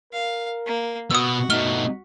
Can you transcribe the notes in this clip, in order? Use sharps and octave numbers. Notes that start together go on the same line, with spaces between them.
A#4 F5
A#3
B2 F#4 D#6 E6
B2 A3 D#4 F6 G7